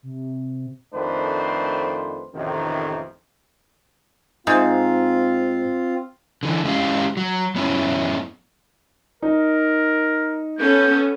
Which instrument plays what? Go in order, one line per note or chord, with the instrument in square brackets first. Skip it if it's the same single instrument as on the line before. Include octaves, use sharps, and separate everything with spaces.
[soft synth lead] C3
[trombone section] F2 D#3 A3 D4 B4 C5
A1 F2 C3 D#3
[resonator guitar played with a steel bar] G#2 [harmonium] C4 F4 F5
[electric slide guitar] D3 E3
G#3 C#4 D4 E4 G4 F5
F#3
F#2 B3 C#4 E4
[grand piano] D#4 [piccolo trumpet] A#4
[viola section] B3 C#4 A4 [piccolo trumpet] G6